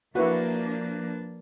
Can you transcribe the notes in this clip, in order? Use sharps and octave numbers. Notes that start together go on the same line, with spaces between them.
F3 A#3 D4 E4 F#4 B4